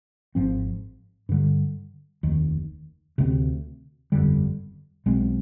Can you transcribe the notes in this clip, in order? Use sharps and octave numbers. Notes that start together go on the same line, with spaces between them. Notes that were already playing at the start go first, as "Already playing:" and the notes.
G#1 G#2 F3 C4
G2 D3 G3
F1 D#2 D#3
D2 C3 G3 C4
G1 F2 D3 G3
B1 B2 G#3 C4